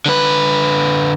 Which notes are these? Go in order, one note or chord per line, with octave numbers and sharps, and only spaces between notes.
D3 B4